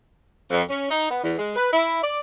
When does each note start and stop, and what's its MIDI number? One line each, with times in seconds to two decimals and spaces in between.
0.50 0.62 41
0.69 0.87 61
0.90 1.10 63
1.11 1.21 59
1.24 1.34 40
1.39 1.55 56
1.56 1.73 71
1.73 2.02 64
2.03 2.19 74